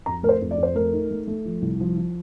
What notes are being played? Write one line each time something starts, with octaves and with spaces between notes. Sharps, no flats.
F2 A#5
A3 A#4
C5
F2
D5
F2
C5
A3 A#4
D#4
A3
A3
F3
C2
F3
F3